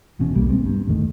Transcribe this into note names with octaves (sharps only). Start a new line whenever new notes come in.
E1 E2 B2 C#4
D#1 B1 G3 A#3
G3 G#3 B3 C4
G2
A1 E2 D#3 A3